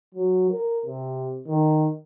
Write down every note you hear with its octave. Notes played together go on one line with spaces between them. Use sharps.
F#3
A#4
C3
D#3